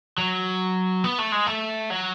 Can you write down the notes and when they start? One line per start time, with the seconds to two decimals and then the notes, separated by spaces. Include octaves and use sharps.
0.18 F#3
1.04 B3
1.19 A3
1.32 G#3
1.47 A3
1.90 F#3